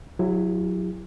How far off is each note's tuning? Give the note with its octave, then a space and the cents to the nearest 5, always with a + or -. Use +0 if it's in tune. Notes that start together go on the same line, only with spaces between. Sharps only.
F#3 -15 E4 +20 G4 +45